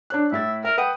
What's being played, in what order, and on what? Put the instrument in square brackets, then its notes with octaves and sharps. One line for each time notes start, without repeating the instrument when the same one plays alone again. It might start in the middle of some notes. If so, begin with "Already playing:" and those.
[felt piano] D4 C#5 F#6
[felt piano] A2 E4 A6 [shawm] E5
[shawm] A#4 [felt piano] E5
[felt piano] B4 F#5 G5 [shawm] D#6